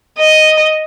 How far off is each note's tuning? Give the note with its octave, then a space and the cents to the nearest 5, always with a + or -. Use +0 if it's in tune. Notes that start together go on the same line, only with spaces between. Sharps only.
D#5 +0